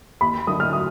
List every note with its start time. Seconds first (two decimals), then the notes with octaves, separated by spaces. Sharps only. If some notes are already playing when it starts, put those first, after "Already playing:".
0.21 D#2 B5
0.47 D3 F#3 A#3 D4 D#6
0.60 F6
0.73 D#6